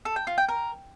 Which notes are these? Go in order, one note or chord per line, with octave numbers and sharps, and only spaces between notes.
A4
G5
F4
G5
A#4